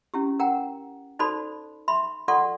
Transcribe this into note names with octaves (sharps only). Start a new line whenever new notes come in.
C#4 E4 G4
A#4 F#5 G5 A#5
D#4 F#4 A4 C5 D5 B5
E5 B5 C6
F4 A4 D5 F#5 C6 C#6